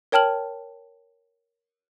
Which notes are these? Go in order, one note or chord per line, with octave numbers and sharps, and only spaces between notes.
A#4 C#5 G5 A5 F6 F#7